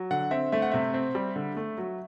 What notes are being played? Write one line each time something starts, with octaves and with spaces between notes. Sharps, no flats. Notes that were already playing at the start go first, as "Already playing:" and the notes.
Already playing: F#3
D3 F#5
C4 E5
A3 E5
F#5
C3 E5
C4
G3
D3
A3
F#3